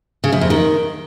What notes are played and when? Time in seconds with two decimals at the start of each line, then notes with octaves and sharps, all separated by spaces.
0.24 C#3
0.33 F#2
0.41 F2
0.50 D#3